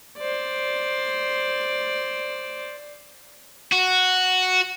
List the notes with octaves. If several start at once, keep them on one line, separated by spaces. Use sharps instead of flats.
C5 D5
F#4